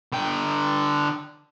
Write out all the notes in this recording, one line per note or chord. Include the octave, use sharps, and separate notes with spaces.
D3 G5